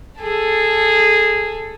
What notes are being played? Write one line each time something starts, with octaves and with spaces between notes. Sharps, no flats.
G#4 A4